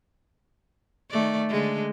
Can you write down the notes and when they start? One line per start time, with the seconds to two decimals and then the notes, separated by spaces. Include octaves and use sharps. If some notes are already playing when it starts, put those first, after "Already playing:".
1.10 D#3 A3 D5
1.49 D3 G#3